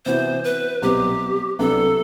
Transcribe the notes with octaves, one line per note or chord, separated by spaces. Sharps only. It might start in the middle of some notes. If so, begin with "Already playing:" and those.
C3 E3 B3 F#4 C5
B4
C2 B2 F#3 C4 G4
C2 C3 F#3 B3 D4 A4